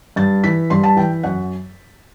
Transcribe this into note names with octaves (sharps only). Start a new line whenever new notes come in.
G2 A6
E3 B6
G2 C6
A5
E3 G5
F#2 F#5